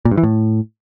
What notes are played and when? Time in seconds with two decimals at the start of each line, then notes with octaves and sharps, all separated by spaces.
0.05 A#2
0.11 G2
0.17 E3
0.23 A2